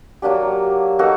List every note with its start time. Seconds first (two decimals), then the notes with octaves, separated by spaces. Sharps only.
0.22 F#3 A#3 D4 G4
0.99 A#3 D#4 F#4 A4